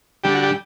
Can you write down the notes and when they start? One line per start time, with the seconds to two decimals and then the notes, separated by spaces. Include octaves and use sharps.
0.24 D3 G3 G4
0.35 F#4
0.44 G4